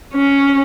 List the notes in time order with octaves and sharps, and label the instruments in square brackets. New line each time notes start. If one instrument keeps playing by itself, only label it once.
[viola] C#4